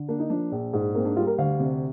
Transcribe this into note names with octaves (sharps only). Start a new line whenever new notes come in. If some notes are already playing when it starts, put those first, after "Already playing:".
Already playing: D3
A#3 D4
D#4
F3 D4
A#1
G#2
A#3 C4
D4
G3 F4
A#4
D2 F5
C3